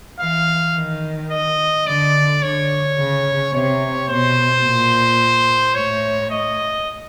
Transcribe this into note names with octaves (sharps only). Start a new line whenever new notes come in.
E3 F5
D#3
D#5
D3 D5
D3 C#5
C#3
C3 C#5
B2 C5
A#2
A2 C#5
D#5